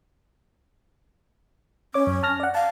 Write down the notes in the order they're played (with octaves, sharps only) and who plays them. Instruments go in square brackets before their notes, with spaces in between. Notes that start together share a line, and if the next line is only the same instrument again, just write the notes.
[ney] C#4 [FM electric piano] C#5 D6
[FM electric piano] F#2
A5 F6 A#6
D5 F#5
[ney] F5 [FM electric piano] A5